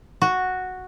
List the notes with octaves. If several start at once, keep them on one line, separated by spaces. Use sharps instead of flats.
F#4